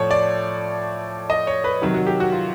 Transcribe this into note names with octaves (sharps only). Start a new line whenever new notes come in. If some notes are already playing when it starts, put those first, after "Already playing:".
Already playing: A2 F3 C#5 D5
D5
D#5
C#5
B4
C3 D#3 F#3
F#4
G4
F#4
F4